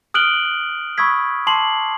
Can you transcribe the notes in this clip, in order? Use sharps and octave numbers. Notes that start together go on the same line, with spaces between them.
D#6 F6 F#6 D7 F#7 G7
B5 C#6 D#6 E6 G#6 B6
A5 C6 D6 C7 F#7